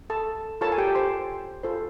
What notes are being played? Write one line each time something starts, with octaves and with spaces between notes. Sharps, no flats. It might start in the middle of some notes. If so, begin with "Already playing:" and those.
Already playing: C#4
A4 A5
F4 A4 A#4 C#5 A5
G#5
G4 G5
C5 C6
F4 A4 C5